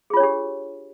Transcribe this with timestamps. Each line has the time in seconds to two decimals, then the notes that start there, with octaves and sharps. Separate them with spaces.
0.10 G#4
0.14 F4
0.17 C#5
0.20 D4
0.23 G4